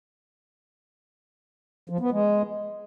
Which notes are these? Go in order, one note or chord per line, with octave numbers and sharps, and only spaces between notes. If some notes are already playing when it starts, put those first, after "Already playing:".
F3
B3
G#3